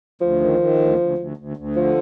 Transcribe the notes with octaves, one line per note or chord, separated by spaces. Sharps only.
D2 F3
D#3
D#3
D2
D2
D2
D2
D2
D3 F3